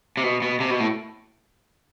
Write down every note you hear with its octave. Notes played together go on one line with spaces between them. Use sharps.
C3
B2
B2
C3
B2
A2